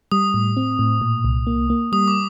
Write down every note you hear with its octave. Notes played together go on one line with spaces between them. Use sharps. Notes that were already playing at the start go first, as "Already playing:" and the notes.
G3 D#6
A2
C4
A2
A#2
C2
A#3
A#3
G3 D#6
D6